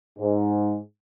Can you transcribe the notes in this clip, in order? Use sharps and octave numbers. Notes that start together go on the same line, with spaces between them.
G#2